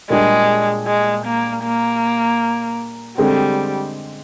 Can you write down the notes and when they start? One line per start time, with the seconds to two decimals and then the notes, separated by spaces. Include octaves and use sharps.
0.10 A#2 G3 G#3 D4 G#4
0.87 G#3
1.26 A#3
1.64 A#3
3.18 D3 G3 G#3 C4